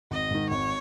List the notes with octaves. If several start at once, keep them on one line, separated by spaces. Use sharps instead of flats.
G#1 D#5
G#2 D#3
G#1 C#5